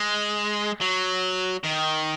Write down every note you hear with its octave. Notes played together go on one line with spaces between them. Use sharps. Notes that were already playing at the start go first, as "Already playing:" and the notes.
Already playing: G#3
F#3
D#3